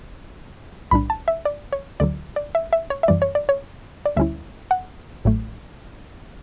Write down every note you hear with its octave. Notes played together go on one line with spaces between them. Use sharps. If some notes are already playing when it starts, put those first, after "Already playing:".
B1 A2 G3 D4 B5
A5
E5
D5
C#5
D2 D3 F#3 D5
D5
E5
E5
C#5
E5
F#2 E3 G3 D5
C#5
D5
C#5
D5
D2 D3 G3 C#4 E4 E5
F#5
A1 A2 F#3 A3